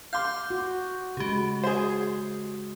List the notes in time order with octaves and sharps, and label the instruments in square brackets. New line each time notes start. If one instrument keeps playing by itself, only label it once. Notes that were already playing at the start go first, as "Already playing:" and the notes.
[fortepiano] F5 C6 [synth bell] D6 G6
[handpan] F#4
[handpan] C#3 G#3 [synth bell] F#4 G4
[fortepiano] G#4 C5